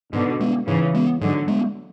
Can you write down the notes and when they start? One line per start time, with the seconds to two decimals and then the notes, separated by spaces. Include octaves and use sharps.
0.13 G#2 B2 D3
0.40 G#3 B3
0.67 G#2 C#3 E3
0.95 G#3 B3
1.21 G#2 D3 F#3
1.48 G#3 B3